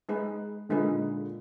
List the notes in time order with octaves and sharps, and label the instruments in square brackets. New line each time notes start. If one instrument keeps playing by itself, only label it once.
[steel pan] G#3 D#4 G#4 B4
[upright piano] A#2 D3 [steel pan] G#3 D#4 G#4 B4